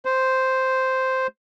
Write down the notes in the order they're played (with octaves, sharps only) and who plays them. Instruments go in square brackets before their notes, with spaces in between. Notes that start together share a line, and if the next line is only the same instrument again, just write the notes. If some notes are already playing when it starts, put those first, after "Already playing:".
[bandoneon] C5